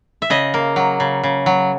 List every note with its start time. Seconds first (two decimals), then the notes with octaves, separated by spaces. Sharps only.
0.22 E5
0.30 C#3 D#5
0.54 A#3
0.76 F#3
1.00 C#3
1.23 C#3
1.46 F#3